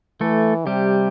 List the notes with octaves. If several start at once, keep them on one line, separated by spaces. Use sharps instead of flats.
E3 A3 A4
C3 G3 G4